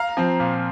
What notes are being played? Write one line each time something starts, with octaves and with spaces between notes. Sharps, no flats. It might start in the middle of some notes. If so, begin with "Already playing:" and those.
Already playing: F5 A#5
F3 C4
A#2